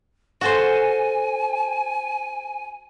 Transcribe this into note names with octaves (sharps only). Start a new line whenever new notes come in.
F#4 A4 C5 G#5